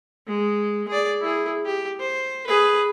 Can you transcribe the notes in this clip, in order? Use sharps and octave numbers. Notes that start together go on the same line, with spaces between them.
G#3
G#4 D5
E4 G#4
G4
C5
G#4 B4